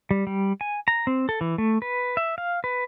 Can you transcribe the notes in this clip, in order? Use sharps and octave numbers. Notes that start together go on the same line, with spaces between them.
G3
G3
G#5
A#5
C4
A4
E3
A3
B4
E5
F5
B4